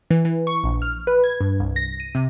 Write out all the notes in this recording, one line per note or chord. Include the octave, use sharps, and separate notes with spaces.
E3
E3
C#6
A#1
F6
B4
G#6
G2
C2
A#6
D#7
C3